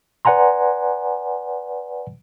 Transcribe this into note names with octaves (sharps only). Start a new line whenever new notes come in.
B4 D5 F#5 G#5 A#5 C6